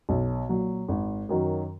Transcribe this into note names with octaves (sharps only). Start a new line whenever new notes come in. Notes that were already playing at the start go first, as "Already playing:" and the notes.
B1
A#2 F#3
G#1
F#2 D#3 F#3